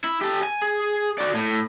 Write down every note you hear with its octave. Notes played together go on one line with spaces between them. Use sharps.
E4
G4 A4
G#5
G#4
F#4 D5
A2